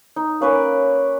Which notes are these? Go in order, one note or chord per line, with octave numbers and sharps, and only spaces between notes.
D#4
A#3 C#4 B4 D5